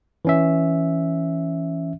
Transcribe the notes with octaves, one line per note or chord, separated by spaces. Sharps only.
E3 C#4 E5